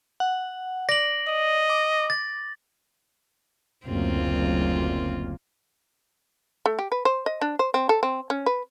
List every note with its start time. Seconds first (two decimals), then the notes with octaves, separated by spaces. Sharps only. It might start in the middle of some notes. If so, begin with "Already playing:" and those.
0.20 F#5
0.89 D5 A#6 F#7
1.28 D#5
1.70 D6
2.10 A6
3.87 F#1 D2 A#3 C4 F4
6.66 A3
6.79 G4
6.92 B4
7.05 C5
7.26 D#5
7.41 D4
7.59 C5
7.74 C4
7.89 A4
8.03 C4
8.30 C#4
8.46 B4